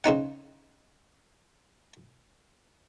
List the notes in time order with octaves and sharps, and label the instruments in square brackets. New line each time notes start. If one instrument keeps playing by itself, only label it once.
[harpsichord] C#3 C4 D#4 F#5